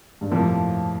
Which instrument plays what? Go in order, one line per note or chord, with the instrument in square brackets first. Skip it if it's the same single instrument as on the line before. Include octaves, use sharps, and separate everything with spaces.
[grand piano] G2
[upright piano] F2 C3 F3 A#3 [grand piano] A2